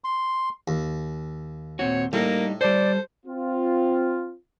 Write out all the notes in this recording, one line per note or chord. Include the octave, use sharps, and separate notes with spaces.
C6
D#2
A#2 C4 F#4 C#5
A2 G3 A#3 D#4
G3 A4 C5 D5
C4 F4